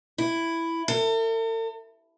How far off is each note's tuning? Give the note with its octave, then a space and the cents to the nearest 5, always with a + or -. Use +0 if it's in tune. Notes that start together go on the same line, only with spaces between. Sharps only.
E4 +5
A4 +45